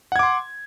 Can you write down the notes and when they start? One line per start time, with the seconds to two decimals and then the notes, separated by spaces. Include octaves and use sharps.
0.12 F#5
0.16 G#6
0.19 D6
0.23 C6